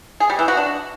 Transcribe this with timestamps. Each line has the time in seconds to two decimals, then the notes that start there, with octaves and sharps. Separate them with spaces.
0.20 G#4
0.30 G3
0.39 E3
0.48 F#4
0.57 D4